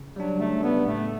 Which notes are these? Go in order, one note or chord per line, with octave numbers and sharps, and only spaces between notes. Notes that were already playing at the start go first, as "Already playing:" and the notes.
Already playing: C#3
F#3 G3 D4
C#3 A3
G3 B3 D4
A2 A3